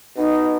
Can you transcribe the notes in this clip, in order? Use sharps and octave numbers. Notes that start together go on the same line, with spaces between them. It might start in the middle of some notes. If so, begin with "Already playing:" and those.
B2 D#4